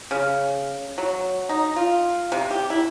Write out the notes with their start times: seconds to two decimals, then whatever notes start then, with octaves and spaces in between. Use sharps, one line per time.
0.11 C#3
0.98 F#3
1.49 D#4
1.76 F4
2.32 C3
2.51 G4
2.70 E4